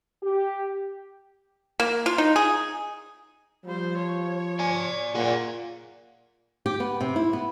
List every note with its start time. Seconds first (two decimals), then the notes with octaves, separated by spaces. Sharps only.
0.23 G4
1.80 A#3
2.06 F4
2.18 D#4
2.36 G#4
3.65 F3 G3 C5
3.99 C#5
4.59 D5 G#5
5.15 A#2 G#4 F#5
6.66 G4
6.80 B3
7.01 C3
7.16 E4
7.33 B3